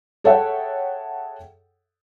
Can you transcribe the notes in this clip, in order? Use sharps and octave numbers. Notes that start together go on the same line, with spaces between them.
G#4 A4 C#5 E5 F#5 G5